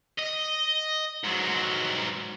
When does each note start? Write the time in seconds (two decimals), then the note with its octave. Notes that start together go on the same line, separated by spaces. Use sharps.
0.18 D#5
1.24 G#2 F#3